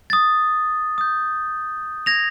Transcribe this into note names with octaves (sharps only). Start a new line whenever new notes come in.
D#6 A6
D#6 G6
G#6 A#6 F7